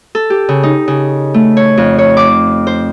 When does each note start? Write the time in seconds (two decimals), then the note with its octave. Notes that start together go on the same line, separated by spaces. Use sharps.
0.15 A4
0.30 G4
0.49 C#3
0.63 D#4
0.88 C#3
1.34 A3
1.57 C#5
1.77 F2
1.98 C#5
2.17 D6
2.67 C5